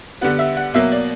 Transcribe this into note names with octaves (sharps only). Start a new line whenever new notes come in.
D3 G3 B3 F#5
E5
F#5
B2 F#3 A#3 E5
D5